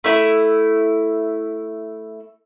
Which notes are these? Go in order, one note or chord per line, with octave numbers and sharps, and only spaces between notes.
A3 E4